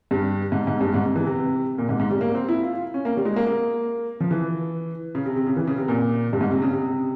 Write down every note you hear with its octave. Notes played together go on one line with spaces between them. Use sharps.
G2
G#2
G#2
G2
G#2
C3
E3
C3
A#2
G#2
G#2
G3
A#3
C4
E4
F4
F4
C#4
A#3
G3
G#3
A#3
A#3
F3
E3
C#3
C3
C3
C#3
E3
C#3
C3
A#2
G2
G#2
C3
C#3
C3